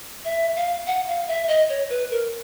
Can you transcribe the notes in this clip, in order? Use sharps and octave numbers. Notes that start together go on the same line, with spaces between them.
E5
F5
F#5
F5
E5
D#5
C#5
B4
A#4